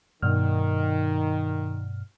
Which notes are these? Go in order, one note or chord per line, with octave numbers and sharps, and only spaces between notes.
G2 B2 D#3 F6